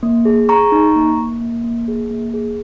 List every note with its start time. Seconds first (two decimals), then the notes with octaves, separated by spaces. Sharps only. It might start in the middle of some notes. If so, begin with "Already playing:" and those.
0.03 A#3
0.25 G#4
0.49 G#4 A#5 C#6
0.72 D#4
0.96 A#3
1.18 A#3
1.41 A#3
1.64 A#3
1.88 G#4
2.10 A#3
2.34 G#4